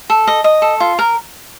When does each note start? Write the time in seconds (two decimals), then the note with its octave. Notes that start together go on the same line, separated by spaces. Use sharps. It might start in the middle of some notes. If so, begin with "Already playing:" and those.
0.10 A4
0.27 D#5
0.44 D#5
0.62 A4
0.80 F4
0.99 A#4